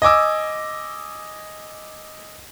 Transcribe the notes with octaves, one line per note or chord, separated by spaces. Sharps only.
D#5 G#5 D6 E6